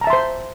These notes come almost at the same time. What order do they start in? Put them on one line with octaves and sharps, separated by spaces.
A#5 A5 E5 C6 C5